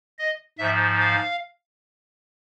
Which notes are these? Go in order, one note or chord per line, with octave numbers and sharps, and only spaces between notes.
D#5
G#2 F3 E5
F5